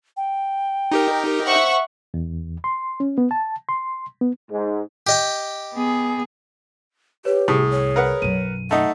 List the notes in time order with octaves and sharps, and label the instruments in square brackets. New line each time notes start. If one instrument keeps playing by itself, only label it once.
[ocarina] G5
[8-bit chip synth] D#4 G4 A#4
[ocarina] C5 [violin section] E5 F#5 C#6
[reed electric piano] E2
C6
C#4
B3
A5
C6
B3
[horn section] G#2
[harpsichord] G4 D#5 G5
[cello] B3 G#4
[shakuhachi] G4 [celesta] B4 C#5
[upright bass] C2 [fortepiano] A2 [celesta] G#4 D#6
[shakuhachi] C#5
[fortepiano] A#4 B4 F#5
[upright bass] B1 F#2 [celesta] D#7
[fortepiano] A3 D#4 [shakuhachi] F#5